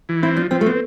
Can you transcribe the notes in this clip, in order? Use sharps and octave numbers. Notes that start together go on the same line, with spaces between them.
E3
C4 E4
F3 D4
F3 C4
A3
B3 C4